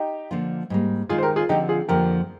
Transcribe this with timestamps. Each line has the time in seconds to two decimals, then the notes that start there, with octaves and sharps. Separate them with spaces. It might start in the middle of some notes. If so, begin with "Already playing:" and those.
Already playing: D#4 G4
0.31 D3 F3 A#3 D4 F4
0.70 G#2 G3 A#3
1.09 D#3 G#3 D#4 F4 G#4
1.18 C5
1.23 G4 A#4
1.36 F4 G#4
1.49 D3 F3 C4 D#4 G4
1.69 F4 G#4
1.89 F2 D3 F3 A#3 G4 A#4